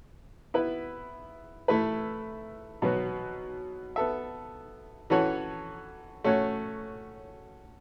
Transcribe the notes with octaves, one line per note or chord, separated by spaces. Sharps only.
B3 E4 B4
A3 E4 B4
B2 F#3 B3 F#4
B3 A4 E5
E3 C#4 F#4 A4 C#5
A3 C#4 F#4 C#5